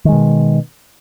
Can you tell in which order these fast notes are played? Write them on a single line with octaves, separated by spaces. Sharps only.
D#3 G#3 B2